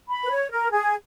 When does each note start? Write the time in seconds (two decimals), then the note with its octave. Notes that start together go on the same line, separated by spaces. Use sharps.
0.09 B5
0.24 B4
0.30 C#5
0.51 A#4
0.72 G#4